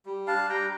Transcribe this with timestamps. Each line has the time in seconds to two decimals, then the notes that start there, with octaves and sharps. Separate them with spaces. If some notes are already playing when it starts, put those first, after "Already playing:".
0.06 G3
0.27 D4 F5 A5
0.49 G3 G5 A#5